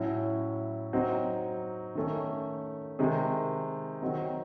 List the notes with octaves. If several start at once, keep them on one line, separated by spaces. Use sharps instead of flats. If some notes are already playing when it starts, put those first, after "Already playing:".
Already playing: A2 F#3 C#4 E4
F#3 C4 D#4
D#3 A3 C#4
C3 D#3 G#3
D#3 F#3 C4 D#4